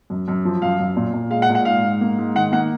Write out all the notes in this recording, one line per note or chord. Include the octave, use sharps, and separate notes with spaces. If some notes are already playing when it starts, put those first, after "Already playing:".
F#2
F#2
F3
F#2 F5
F#2
A#2
A#2
G#3 F5
F#5
A#2
F#5
G#2 F5
G#2
A#3
G#2
D#3 F#5
A#3 F#5